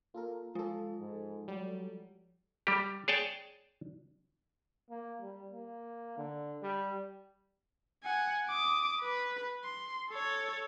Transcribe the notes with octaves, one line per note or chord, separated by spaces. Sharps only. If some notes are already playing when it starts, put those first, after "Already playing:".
A#3 F4 A4 A#4
F3 G#3 F4 A4
G#2
F#3 G3
G3 G4
G#4 C#5 D5 G5 A5
A#3
G3
A#3
D3
G3
F#5 G#5
D6 D#6
B4
C6
A4 C#5